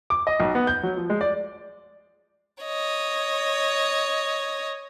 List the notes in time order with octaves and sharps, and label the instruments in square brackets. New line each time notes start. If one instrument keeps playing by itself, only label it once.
[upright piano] D6
D#5
B1
B3
G6
F#3
F3
G#3
D5
[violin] C#5 D#5